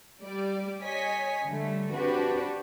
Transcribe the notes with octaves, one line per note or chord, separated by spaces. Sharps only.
G3 D5
C#5 D#5 G#5 B6
D3 G3 A3
C4 D4 F#4 G4 B4